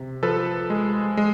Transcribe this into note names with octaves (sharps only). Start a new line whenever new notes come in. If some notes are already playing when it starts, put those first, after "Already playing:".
Already playing: C3
F3 A4 B4
G#3
G#3